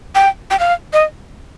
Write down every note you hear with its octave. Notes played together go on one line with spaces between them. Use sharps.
G5
G5
F5
D#5